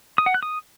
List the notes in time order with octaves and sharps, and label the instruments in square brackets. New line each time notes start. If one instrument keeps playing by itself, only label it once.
[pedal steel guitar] D#6
F#5
F#6
D#6